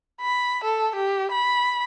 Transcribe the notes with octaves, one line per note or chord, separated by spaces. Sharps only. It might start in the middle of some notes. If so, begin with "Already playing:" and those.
B5
A4
G4
B5